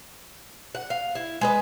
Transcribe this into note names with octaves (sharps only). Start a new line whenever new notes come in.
F#5
F5
E4
G#3 B4 D#5